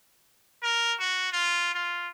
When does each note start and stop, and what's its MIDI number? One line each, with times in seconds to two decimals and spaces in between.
0.63 0.94 70
0.99 1.29 66
1.32 1.73 65
1.74 2.08 65